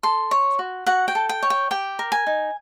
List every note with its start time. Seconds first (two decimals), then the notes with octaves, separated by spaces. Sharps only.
0.03 A4 C6
0.31 C#5
0.59 F#4
0.86 F#4 F#5
1.08 G5
1.15 A4
1.29 G5
1.43 C#5
1.50 G5
1.71 G4 G5
1.99 A#4
2.12 G#5
2.27 D#4